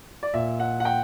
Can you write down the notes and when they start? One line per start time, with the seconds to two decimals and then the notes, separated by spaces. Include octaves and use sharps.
0.23 D5
0.33 A#2 E5
0.60 F#5
0.80 F#5
0.85 G5